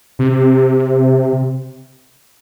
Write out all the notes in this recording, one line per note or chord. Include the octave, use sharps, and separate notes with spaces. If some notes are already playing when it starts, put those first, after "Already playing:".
C3